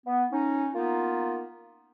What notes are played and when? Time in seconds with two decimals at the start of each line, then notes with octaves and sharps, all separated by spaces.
0.07 B3
0.32 C#4 D#4
0.74 A#3 B3 D#4 F4